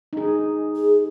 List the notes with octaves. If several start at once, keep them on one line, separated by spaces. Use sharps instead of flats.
D#4 G#4
G#4